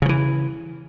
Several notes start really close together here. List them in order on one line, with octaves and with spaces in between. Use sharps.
C#3 F3 E3